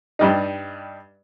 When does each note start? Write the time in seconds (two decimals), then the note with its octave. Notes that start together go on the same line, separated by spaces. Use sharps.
0.19 G2 G3 D#4